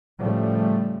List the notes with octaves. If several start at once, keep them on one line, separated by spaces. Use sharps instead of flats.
A2 C#3 F3 G3 A3